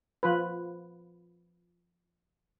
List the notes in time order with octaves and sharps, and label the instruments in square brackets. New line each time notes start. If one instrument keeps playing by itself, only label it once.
[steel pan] F3 F4 B4